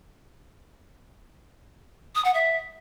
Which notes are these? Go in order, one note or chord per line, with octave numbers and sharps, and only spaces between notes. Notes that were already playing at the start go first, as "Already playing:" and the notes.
D#6
F#5
E5